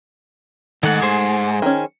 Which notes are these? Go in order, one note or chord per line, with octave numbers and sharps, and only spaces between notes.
G#2 D#3 A3 F#5
G#4 C5
D#3 C#4